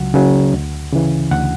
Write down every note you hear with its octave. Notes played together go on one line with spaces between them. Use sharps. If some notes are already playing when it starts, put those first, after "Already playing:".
Already playing: C#2 C#3 F#3 F#5
C#3 F#3
D2
C#3 E3
D2 F#5